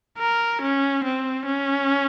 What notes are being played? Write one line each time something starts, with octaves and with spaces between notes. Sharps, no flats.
A#4
C#4
C4
C#4